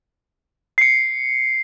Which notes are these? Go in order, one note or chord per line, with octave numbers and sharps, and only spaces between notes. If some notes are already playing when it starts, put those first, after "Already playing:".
C7 C#7